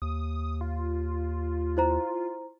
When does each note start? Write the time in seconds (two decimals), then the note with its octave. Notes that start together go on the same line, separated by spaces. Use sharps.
0.02 D#2 D#6
0.61 F4
1.77 E4 C5 A#5